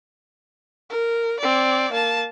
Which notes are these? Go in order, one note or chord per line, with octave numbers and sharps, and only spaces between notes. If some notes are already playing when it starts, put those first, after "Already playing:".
A#4
C4 D5
A#3 A5